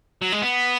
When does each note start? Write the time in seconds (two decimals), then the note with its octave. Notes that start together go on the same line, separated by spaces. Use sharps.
0.22 F#3
0.33 G#3
0.42 B3